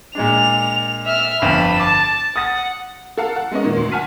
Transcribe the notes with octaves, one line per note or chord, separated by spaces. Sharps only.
A#2 G#3 D4 F7
E5 F6
G1 F2 F5 B5 E7
A5 D6
F#5 D#6 A6
A4 A#4 F5 F#5 A5
F#5
G#3 B3 C#4 A#4 D#5
A#2 D#3 A#3
D2 C6
F#5 G#5 A5 F6 B6 D#7